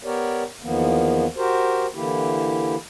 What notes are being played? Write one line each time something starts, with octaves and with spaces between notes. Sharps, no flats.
B3 G4 A#4 C#5 D5
E2 D#3 F3 A#3 B3
F#4 G4 A#4 C5
D3 E3 A#3 E4 G4